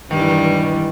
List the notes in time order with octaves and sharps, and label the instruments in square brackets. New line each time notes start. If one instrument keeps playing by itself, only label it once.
[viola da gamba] G2 G3 [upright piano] D#3
[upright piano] E3
D#3
E3
D#3
E3
D#3
E3